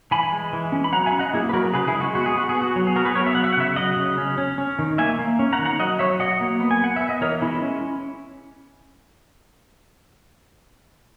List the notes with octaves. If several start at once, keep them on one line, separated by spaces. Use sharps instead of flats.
E3 G#5 B5
G#3
E3
C#4
B5
F#3 F#5 A#5
E5 G#5
C#4
D#5 F#5
A#3 E4 G#4
B4
F#3 F#4 A#4
C#3 G#4 B4
E4 G#4
G#3
F#4
B3 F#4
G#4
B3 F#4
G#4
B3
F#4
F#3
G#4
B3 F#4 A#4
G#4 B4
B3 A#4 C#5
E5
F#3 F#5
E5
F#5
C#3 C#5 E5
F#3 D#5 F#5
C#3
C#4
C#4
C#4
D#3
A#3 E5 G#5
A#3
C#4
F#5 A#5
D#3
F#5 A#5
F#3 D#5 F#5
F#3 C#5 E5
F#3 D#5 F#5
A#3
B3
G#5
B3 F#5
B3 E5
D#5
E3 A#4 C#5
G#3 E4
C#4